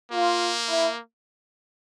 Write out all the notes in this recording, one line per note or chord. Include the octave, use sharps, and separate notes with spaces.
A#3 F4
E4